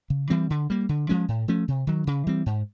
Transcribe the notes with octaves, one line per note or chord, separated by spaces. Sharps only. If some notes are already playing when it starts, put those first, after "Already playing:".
C#3
E3 G3 C4
D3
G3 A#3
D3
F3 G#3 C#4
A2
F3 A3 C#4
C3
D#3 F#3
C#3
E3 G3 C4
G#2